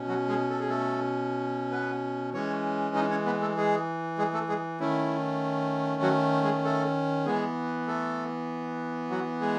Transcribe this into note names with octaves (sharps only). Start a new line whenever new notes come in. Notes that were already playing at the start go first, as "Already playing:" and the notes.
Already playing: B2 C#4
F#3 F#4
G#3 G#4
A4
G#4
A3 A4
B3 B4
E3 G#3 C#4 C#5
D#4 D#5
C#4 C#5
B3 B4
A3 A4
G#3 G#4
G#3 G#4
A3 A4
G#3 G#4
D#3 A3 C#4 E4
F#3 F#4
G#3 G#4
A3 A4
E3 G#3 B3 G#4
A3 A4
F#3 F#4
G#3 G#4